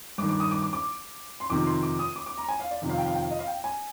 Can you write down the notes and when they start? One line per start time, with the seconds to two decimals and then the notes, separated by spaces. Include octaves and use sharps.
0.18 G2 D6
0.23 D#3
0.29 D6
0.40 D#6
0.51 D6
0.62 D6
0.73 D6
1.40 C6
1.50 F2 C3 D#3 D6
1.66 C6
1.83 D6
1.99 D#6
2.16 D6
2.26 D6
2.38 A#5
2.49 G#5
2.60 F5
2.71 D5
2.82 F2 C3 D#3
2.90 F5
2.98 G5
3.06 F5
3.14 G5
3.23 F5
3.31 D#5
3.39 F5
3.47 G5
3.64 G#5